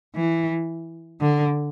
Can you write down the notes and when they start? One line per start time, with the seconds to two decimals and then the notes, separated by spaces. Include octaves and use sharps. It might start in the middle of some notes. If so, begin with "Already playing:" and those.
0.15 E3
1.21 D3